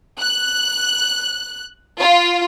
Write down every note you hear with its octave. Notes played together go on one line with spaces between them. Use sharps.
F#6
F4